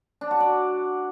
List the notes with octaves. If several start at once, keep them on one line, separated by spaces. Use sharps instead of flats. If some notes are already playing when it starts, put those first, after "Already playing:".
D4
F#4
D5